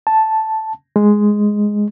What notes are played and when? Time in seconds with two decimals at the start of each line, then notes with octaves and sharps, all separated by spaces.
0.07 A5
0.96 G#3